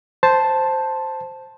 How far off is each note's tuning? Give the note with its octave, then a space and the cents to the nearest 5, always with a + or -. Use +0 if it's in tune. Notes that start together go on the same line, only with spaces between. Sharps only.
C5 +0 A5 +0